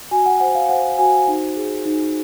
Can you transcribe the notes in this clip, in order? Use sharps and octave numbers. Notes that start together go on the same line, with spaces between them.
F#4 G#5
F#5
C5 F#5
F5
C5 F#5
F#4 G#5
D#4
G#4
D#4